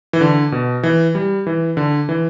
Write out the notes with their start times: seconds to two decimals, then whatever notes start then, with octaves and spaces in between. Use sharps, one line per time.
0.13 E3
0.21 D3
0.52 B2
0.83 E3
1.15 G3
1.47 E3
1.77 D3
2.09 E3